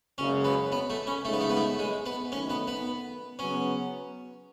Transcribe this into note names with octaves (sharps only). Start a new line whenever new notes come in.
F#1 F#2 C#3 G#3 C#4
B3
B3
A3
C#4
C#2 C#3 G#3 A3 D#4
B3
A3
B3
A3
G#3
B3
F#2 D#3 A3 C#4
B3
B3
C#3 F#3 B3 C#4